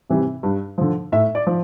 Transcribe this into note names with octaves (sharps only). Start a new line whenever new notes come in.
C3 E3 G3
G2
D3 F3
A2 E5
D5
F3